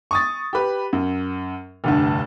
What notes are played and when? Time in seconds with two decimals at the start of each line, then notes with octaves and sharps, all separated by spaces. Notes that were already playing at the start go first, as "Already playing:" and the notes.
0.11 C#6 D#6 A6
0.53 G4 B4
0.93 F#2
1.84 F1 D2 G2